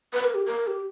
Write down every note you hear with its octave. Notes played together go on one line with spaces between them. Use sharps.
B4
A#4
G4
A#4
G4